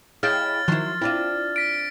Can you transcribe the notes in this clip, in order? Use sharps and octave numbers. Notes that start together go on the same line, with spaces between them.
E4 G#4 C#5 D#5 F5 G5 F6 A6
D#3 F3 F#3 E4 C6
C4 D4 E4 F4
B6 D7